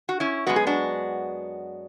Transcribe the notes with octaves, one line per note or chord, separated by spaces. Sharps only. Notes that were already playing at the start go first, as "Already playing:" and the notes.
F#4
C#4 E4
F#2 C#3 G#3 B3 F#4
G#4
D4 F#4